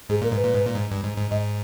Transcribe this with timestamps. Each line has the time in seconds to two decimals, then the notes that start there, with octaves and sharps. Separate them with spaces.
0.09 G#2 G#4
0.21 A#2 A#4
0.32 G#2 B4
0.43 A#2
0.55 G#2
0.66 A#2
0.76 G#2
0.91 G2
1.04 G#2
1.17 G#2
1.31 G#2 D#5